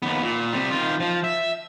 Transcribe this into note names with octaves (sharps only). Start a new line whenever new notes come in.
D#2 B3
A#2
C3 G3
D#3 F4
F3
E5